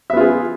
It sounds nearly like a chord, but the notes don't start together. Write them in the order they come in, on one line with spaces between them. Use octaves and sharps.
E5 B3 F4 G#4